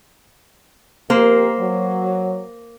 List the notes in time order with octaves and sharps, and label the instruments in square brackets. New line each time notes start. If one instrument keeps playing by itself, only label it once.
[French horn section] F2 G4 A#4 [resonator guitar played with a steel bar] A#3 C5
[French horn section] F#3